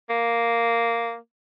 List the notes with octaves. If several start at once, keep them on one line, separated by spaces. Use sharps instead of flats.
A#3